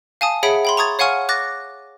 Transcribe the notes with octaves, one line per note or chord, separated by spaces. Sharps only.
F5 G#5 A5 D#6
G#4 C#5 E5 F#5 B5 D7
G5 B5 C6
A#5 C#6 D#6 G#6 A6
C#5 F5 F#5 G#5 C#6 F6
D6 F#6 A6 A#6